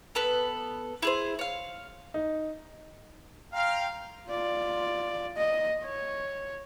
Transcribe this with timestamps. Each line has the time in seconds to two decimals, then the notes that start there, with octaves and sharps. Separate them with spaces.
0.15 B3 A4 B4
1.02 E4 G#4 C5
1.39 C#5 F5
2.14 D#4
3.53 F5 G5 A#5 C6
4.29 F4 D5
5.37 D#5
5.84 C#5